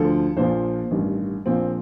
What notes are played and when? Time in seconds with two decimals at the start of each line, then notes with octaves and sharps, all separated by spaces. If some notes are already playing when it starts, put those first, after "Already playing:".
Already playing: D2 D3 F3 A4
0.37 A#1 A#2 F3 C5
0.91 A1 G2 D#3
1.46 A#1 A#2 F3 C4